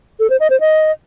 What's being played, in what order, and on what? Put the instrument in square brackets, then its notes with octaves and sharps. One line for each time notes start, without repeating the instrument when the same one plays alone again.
[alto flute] A4
C5
D#5
C5
D#5